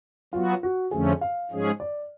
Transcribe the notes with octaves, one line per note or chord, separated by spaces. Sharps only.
F#3 B3 F4 F#4
F#4
F2 D3 F3 A3 C#4 G#4
F5
G#2 F3 G#3 C#4 G#4
D5